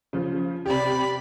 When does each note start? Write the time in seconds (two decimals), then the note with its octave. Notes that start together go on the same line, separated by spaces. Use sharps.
0.13 C#3 F3
0.66 C3 G4 D5 B5